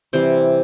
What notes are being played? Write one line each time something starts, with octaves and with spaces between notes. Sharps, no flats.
C3 E3 G3 C5